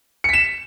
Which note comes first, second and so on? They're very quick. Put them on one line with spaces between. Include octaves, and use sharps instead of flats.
C#7 B6 E7